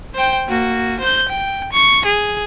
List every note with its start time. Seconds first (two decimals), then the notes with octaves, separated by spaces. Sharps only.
0.15 C5 G5
0.49 A#3 F#4
1.00 C5 G6
1.29 G5
1.73 C#6
2.06 G#4